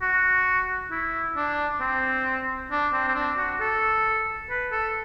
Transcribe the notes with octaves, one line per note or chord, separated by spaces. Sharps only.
F#4
E4
D4
C4
D4
C4
C4
D4
F#4
A4
B4
A4